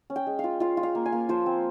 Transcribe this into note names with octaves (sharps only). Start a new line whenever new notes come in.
C#4
G5
G#3
F4 F5
F4 F5
F4
F5
A#3
G#5
A#3
F3 C5
C4